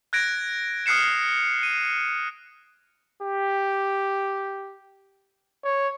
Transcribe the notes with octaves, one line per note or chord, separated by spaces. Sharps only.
F#6 G#6 A#6 D7
D#6 F6 F#6 C7 C#7 E7
D#7
G4
C#5